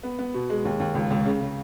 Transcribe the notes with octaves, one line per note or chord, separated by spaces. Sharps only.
B3
B3
B2
G#3
D#2
D#2
C#2
C#2
C#3
C#3